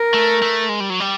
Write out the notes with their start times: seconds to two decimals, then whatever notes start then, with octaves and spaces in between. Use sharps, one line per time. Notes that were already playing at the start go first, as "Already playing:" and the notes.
Already playing: A#4
0.14 A3
0.42 A3
0.69 G#3
0.80 G3
0.90 F#3
1.00 G3